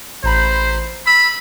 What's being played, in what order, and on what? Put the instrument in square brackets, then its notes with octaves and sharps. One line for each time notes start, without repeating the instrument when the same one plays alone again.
[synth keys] A1 A#5 B5 [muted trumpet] C5
[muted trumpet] B5 [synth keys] E6